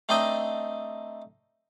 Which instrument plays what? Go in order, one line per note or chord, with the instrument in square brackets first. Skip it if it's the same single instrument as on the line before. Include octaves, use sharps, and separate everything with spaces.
[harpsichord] A3 C4 D4 D#4 D#5